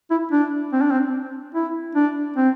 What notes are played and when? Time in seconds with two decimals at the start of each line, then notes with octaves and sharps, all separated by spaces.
0.11 E4
0.32 D4
0.73 C4
0.82 D4
0.91 C4
1.55 E4
1.95 D4
2.36 C4